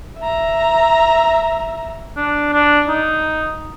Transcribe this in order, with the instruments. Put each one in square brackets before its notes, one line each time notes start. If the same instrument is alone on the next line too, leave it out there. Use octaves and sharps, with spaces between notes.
[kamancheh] E5 A#5
[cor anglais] D4
D4
D#4